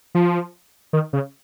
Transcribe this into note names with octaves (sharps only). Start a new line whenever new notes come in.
F3
D#3
C#3